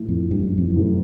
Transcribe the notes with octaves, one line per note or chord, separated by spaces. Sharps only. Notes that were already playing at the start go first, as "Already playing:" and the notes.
Already playing: A#1 A2 E3
F2
G2
F#2
F2
F#2
E2 C3 E3 A3